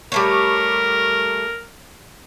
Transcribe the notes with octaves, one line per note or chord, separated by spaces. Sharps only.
G3 A3 A#4 C#5